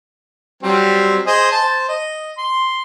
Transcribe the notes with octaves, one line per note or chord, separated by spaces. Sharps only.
F#3 G3 C4
G#4 C5 D#5
C5 A5
D#5
C6